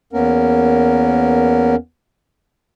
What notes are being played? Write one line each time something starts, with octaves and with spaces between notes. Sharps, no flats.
E2 A#3 B3 C#4 A#4